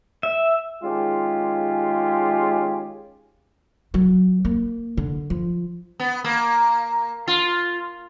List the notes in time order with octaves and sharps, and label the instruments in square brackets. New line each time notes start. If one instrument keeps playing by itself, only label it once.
[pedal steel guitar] E5
[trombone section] D#3 G#3 C#4 F4 G4 G#4
[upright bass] F#3
A#3
D3
F3
[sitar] B3
A#3
F4